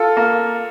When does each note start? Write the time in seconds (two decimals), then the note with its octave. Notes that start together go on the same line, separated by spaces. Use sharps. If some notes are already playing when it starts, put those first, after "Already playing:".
Already playing: F4 A4
0.17 A#3